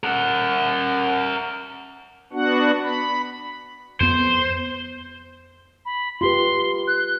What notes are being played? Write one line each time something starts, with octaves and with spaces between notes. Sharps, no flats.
A#4 F#5
B3 D4 F#4 F#5
B5
F2 B3 C5
B5
F4 G4 B4 C6
F#6